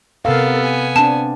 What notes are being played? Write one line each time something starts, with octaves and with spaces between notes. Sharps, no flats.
C3 B3 A4 A#4 F5
G#5
C4 D4 A5